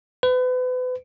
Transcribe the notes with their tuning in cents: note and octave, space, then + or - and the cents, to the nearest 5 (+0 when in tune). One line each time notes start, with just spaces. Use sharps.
B4 +35